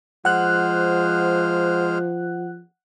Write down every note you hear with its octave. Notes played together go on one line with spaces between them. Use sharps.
F3 G#3 C5 F#5 F6 F#6